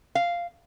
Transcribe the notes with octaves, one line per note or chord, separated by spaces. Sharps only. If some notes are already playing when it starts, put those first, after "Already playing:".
F5